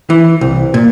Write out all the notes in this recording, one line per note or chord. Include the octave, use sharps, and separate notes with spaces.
E3
C2
A#2